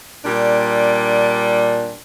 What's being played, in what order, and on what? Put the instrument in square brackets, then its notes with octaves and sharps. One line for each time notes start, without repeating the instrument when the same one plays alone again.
[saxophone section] A#2 G3 D4